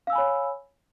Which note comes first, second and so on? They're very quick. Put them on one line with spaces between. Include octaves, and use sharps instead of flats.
F5 E6 G#5 B5 C#5